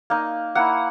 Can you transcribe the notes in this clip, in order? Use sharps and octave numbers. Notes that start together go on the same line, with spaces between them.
A#3 D#4
A#3 E4 F#5